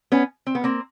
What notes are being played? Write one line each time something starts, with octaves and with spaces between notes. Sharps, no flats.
B3 C#4
C4
B3
A#3 C4